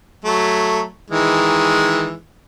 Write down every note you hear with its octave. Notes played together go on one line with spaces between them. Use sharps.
F#3 A3
D#3 E3 G#3